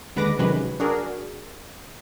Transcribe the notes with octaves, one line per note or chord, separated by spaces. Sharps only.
D#2 D3 G#3 B4 D6 A#6
C3 D#3 F#3 G#3 C#4 B4
D4 F#4 G#4 A#4